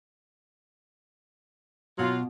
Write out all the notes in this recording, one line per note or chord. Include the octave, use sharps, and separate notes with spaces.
B2 F#3 F4